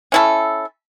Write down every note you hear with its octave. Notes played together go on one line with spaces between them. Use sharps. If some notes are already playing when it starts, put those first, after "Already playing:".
C#4 E4 A4